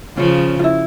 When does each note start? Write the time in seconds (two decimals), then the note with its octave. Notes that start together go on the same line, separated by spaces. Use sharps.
0.17 C#3 F3 C#4
0.59 F4
0.64 E4